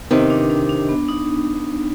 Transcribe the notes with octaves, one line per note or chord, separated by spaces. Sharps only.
C3 D#3 B4
D4
D4
D4
B3
D#4